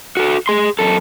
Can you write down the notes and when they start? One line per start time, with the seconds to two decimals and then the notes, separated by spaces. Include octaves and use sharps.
0.17 F#4 A4
0.48 G#4 C6
0.79 F#2 A4